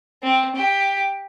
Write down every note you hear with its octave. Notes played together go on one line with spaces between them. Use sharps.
C4
G4